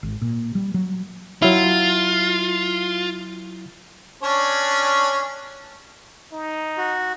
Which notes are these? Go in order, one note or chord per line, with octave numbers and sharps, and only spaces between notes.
G#1
A#2
G3
F#3
F#3 E4 F4
C#4 D4 C#5
D#4
F#4